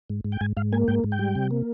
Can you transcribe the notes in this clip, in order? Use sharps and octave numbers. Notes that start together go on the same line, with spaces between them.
G#2
G#2
G5
G#2 G#5
G#2 F5
A#3 G#5
G#2 G5
G#2
G5
G3
C3
A#3